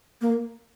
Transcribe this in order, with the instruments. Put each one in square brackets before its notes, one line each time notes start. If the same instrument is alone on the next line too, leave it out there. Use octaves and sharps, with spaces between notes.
[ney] A#3